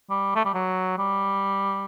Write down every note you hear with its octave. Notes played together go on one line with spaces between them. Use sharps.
G3
A3
G3
F#3
G3